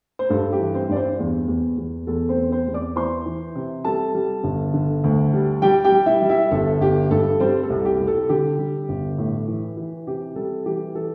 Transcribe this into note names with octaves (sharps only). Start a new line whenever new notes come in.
C5
G2 A4
G4
E3
C4 C5
G2 D5
C4 C5
E2
E2
E2
E2 A4
C4 C5
E2
C4 C5
E2
D5 D6
E3 C5 C6
E3
C3
G3 A4 A5
G3
G1
D3
D2
G3
G3 G4 G5
G4 G5
G3
E4 E5
G3
E4 E5
G1 A4
G1 G4
G2 A4
G3 C4 C5
A4
C2
G4
C2
A4
D3 G4
G3
G1
A2
E3
E3
C3 G4
G3 A4
E3 G4
E3 A4